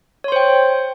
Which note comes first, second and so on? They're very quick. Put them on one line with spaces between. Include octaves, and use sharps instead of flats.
C#5 C6 C5 G5